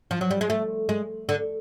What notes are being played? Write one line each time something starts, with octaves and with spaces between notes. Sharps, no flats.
F3
F#3
G3
G#3
A3
G#3
D3